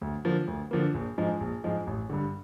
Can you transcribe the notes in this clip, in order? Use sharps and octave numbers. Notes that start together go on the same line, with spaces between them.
D2
D3 F3 A#3
D2
D3 F3 A#3
A#1
G#2 F3 G#3
A#1
G#2 F3 G#3
A1
G2 D3